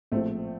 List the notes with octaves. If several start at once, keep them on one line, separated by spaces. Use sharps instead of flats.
A#1 A2 F3 A3 C4